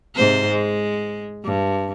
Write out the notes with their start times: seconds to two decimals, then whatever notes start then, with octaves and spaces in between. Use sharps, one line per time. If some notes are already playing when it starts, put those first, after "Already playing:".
0.16 G#2 C3 C5
0.49 G#3
1.44 G2